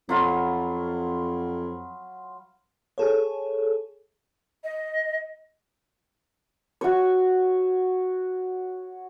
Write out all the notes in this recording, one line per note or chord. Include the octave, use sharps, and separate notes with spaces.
F2 F#3 F4 B5
G#4 A4 C#5
D#5
F#4 C#5